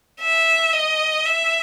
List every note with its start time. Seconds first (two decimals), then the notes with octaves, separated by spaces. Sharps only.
0.21 E5
0.73 D#5
1.26 E5